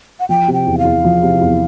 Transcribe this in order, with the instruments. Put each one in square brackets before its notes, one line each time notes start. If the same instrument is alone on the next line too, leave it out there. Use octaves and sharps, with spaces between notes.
[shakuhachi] F#5
[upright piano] F3 [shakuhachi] G5
[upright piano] C3
[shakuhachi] G5
[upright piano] E2
[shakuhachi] F5
[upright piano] E2
F3
C3
E2